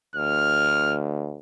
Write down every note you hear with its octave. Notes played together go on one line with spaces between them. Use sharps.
D2 F6